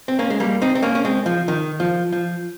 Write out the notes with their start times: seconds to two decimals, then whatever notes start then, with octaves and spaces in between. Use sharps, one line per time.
0.08 C4
0.19 A#3 C#4
0.30 G#3
0.40 G3 A#3
0.62 C4 D#4
0.75 C4
0.83 A#3 C#4
0.95 C#4
1.05 G#3 C4
1.26 F3
1.48 D#3
1.80 F3
2.12 F3